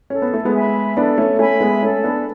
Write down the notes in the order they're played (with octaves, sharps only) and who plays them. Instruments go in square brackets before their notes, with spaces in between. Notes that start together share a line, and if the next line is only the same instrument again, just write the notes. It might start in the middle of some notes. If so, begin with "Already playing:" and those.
[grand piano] C#4 [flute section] A4
[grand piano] B3
A3
G#3 B3
[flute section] E5 G#5 B5
[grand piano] B3 D4 [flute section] A4
[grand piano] A3 C#4
[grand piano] A3 C#4 [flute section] E5 G#5 B5
[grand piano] G#3 B3
[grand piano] A3 C#4 [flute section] A4
[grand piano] B3 D4